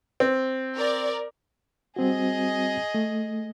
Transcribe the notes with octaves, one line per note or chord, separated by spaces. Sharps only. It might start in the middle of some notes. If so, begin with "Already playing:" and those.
C4
A#4 D5
G3 C4 F#4 G#4 D#5
A3